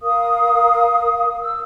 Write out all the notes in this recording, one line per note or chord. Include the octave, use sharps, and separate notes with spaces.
A#4 F5 D#6
E6